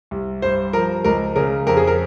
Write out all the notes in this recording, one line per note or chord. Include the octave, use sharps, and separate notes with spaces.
C2
G2 C5
F3 A#4
C#2 A#4
C#3 A#4
F2 A#4
G#4
A#4